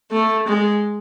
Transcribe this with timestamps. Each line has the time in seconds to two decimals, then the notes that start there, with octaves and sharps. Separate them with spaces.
0.11 A3
0.47 G#3